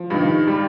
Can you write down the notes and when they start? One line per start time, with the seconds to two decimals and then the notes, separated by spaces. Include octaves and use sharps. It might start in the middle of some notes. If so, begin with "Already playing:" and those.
Already playing: F3
0.10 G2 D#3
0.47 G3